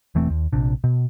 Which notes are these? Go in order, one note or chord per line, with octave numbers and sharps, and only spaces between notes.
E1 E3 A3 C4
D#2
A#1 C3 D4
B2